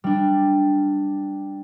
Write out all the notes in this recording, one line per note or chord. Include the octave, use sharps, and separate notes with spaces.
G3 D4